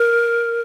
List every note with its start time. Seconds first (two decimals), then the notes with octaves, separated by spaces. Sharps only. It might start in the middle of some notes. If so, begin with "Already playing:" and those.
Already playing: A#4